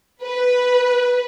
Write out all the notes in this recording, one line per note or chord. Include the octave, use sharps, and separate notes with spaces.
B4